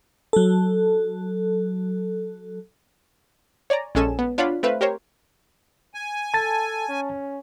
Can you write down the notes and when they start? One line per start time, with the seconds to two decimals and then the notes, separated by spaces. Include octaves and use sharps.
0.33 F#3 A4
3.70 C#5 D5 G#5 A#5
3.95 A#1 G#3 C#4 A4 G#5 E7
4.19 B3
4.38 D4 F4 C#5 F5 F#5 B5
4.63 A3 C4 B4 E5 F5
4.81 G4 A#4 C5 C#5
5.94 G#5
6.34 A4 A5 A6
6.88 C#4